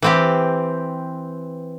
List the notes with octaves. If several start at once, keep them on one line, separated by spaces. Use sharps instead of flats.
E3 C4 G4